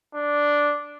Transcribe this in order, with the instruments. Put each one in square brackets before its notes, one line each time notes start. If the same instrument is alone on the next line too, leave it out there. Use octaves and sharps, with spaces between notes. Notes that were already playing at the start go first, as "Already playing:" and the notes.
[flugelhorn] D4